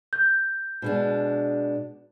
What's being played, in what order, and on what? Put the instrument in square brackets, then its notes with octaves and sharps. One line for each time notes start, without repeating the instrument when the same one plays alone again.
[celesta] G6
[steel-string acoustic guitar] B2 G#3 D4